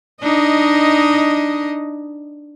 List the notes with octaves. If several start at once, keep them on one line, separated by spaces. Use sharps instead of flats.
D4 D#4 D#5